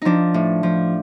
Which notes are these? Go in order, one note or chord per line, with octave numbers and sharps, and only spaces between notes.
F3 D4 D#4
A2
F3